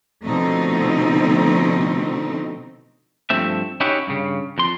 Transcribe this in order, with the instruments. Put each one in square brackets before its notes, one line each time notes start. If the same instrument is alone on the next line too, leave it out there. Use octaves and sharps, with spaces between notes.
[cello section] B2 D3 F3 A3 C4 D#4
[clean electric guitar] G2 F3 A3 C4 E5
C#4 D#4 E4 F#4 G4 C#5
G2 C#3
F2 C6